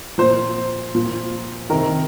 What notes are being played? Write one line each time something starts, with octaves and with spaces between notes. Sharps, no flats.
A#2 F3 C5
A#2 F3
C3 D#3 A#4